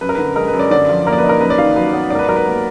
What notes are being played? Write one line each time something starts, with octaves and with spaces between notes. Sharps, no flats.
F#2 B4
A#4
D3 B4
G#3 A#4
B4
F#2
D5
D3 D5
F3
A#3 A#4
D5
B4
D#4
A#4
F#2 B4
D5
D#3 F5
F#3 B4
B3
G#2 A#4 D5
B4
F#3 A#4
B4
A#3